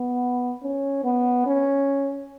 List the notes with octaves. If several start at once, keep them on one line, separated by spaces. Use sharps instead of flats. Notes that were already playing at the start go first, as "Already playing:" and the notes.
Already playing: B3
C#4
B3
C#4